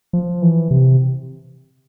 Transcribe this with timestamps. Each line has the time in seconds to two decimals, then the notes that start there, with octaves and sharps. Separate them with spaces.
0.13 F3
0.42 E3
0.71 C3